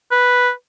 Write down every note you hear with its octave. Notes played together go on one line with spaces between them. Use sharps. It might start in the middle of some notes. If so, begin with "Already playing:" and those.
B4